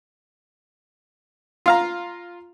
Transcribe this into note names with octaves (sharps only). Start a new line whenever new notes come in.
F4 F5 A#5